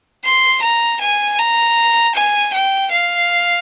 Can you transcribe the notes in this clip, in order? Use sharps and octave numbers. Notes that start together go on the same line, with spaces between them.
C6
A#5
G#5
A#5
G#5
G5
F5